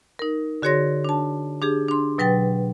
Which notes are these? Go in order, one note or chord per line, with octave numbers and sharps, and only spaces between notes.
D#4 A#4
D3 F#4 G#4 C#5 C6 A#6
D4 A5
D4 G4 G#4
D4 C6
B2 F#3 B4 G5 A6